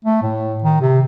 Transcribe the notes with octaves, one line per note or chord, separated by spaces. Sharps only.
A3
A2
D#3
C3